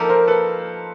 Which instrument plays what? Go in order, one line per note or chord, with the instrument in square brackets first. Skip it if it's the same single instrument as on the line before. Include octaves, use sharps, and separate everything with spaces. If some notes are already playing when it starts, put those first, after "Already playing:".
Already playing: [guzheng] F3 A#3 D#4 G4 [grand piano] A4
[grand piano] A#4 C5
A4 B4